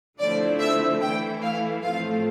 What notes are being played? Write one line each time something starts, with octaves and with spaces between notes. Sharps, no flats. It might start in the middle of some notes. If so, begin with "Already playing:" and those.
D3 F3 A3 C4 E4 D5
E5
E3 A3 E4 G5
F5
A2 F3 A3 C4 F4 F5